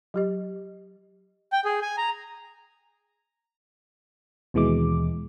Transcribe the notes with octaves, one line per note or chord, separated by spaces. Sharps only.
F#3 G4 D#5
G5
G#4
G#5
A#5
D#2 B2 E3 G#3 D6